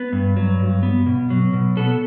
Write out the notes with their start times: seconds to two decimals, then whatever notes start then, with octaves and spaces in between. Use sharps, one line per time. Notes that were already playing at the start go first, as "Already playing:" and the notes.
Already playing: B3 B4
0.12 G2
0.37 F#3
0.59 G2
0.83 B3
1.06 B2
1.30 F#3
1.53 B2
1.77 B3 A4